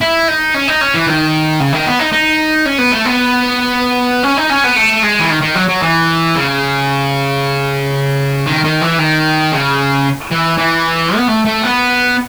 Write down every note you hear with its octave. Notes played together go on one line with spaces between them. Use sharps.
E4
D#4
C#4
D#4
C#4
E3
D#3
C#3
D#3
B3
D#4
D#4
C#4
B3
A3
B3
C#4
D#4
C#4
B3
A3
G#3
E3
D#3
D#3
F#3
F#3
E3
C#3
D#3
D#3
E3
D#3
C#3
E3
E3
B3
A3
A3
B3